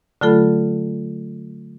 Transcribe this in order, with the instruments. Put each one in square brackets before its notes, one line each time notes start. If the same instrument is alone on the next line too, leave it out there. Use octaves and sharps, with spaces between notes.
[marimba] D3 F#3 A3 F4 A4 B5